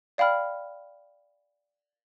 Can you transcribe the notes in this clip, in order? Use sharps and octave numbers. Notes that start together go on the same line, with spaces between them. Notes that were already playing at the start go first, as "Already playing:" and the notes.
D5 F5 G5 B5 F6